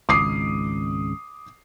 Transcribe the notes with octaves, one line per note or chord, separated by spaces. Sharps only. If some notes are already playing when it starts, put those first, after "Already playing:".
G#1 C#2 D6 D#6 C7